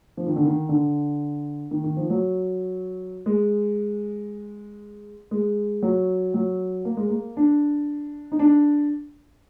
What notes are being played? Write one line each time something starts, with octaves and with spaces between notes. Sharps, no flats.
F3
D#3
D3
D#3
D3
D#3
D#3
F3
F#3
G#3
G#3
F#3
F#3
A#3
G#3
A#3
D4
D#4
D4